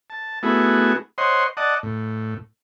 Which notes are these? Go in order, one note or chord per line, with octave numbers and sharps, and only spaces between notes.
A5
A3 B3 E4 F#4 G#4
C5 C#5 D#5 F#5 C6
D5 D#5 F#5 A5
A2